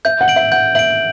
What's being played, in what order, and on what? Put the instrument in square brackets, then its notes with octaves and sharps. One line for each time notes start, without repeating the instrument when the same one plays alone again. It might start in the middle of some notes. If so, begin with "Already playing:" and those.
[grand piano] E5 [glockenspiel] G6
[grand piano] F#5
[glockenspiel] D7 F#7
[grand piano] E5
[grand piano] F#5 [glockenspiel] G6
[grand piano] E5 [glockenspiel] F#7
[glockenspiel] D7